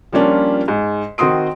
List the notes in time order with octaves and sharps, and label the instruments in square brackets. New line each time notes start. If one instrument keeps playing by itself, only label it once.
[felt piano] F3 G3 A#3 C#4 D4 F4
G#2
D#3 C4 F#4 C6 D#6 D7